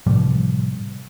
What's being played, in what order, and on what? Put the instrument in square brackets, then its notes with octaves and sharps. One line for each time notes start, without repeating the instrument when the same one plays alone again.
[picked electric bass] A2 C3 F3 G3